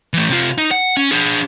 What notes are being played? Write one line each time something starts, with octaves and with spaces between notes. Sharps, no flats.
E3 A3
C3 F4
D#4
F#5
C#4
D4 G#4